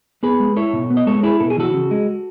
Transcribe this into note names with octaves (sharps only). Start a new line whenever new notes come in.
B3 G#4 B4
G#3
E4 A4 C#5
B2
B3
D#5
G#3 A4 C#5
E4 G#4 B4
B2 A4
G#4
E3 F#4 A4
C#3
G#3